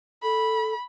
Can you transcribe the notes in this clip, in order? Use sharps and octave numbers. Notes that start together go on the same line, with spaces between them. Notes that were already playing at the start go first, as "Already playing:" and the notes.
A4 B5